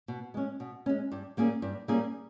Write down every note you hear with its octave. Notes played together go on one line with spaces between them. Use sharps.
B2
G#3 C#4
B2
G#3 C#4
G2
G3 A#3 C#4 G#4
G2
G3 A#3 C#4 G#4